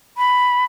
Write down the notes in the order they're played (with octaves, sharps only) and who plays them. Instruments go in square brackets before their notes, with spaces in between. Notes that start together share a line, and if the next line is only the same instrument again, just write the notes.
[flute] B5